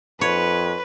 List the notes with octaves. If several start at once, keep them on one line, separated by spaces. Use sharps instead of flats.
F2 B4 C#5